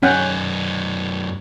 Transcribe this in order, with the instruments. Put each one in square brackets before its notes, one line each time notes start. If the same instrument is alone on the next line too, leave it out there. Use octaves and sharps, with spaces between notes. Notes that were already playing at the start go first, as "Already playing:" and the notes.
[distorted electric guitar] F#2 D#4 [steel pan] C#4 F#5 G5